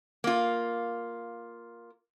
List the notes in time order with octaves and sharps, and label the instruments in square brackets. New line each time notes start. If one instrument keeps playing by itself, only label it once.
[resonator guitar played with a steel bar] A#3 F4